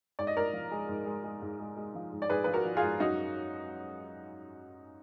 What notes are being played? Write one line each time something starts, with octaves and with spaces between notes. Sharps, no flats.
G#2 D5
D#5
G#2 A#4 D5
F3
G#3
G#2
G#3
G#3
G#2
G#3
G#3
F3
G#2
D5
G#2 G#4 B4
F3 B4
F#4 A#4
F3
F4 G#4
G#2
F#2 D#4 F#4